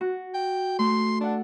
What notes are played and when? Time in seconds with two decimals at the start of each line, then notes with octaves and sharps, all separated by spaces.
0.01 F#4
0.34 G5
0.79 A3 C6
1.21 D4 A4 F#5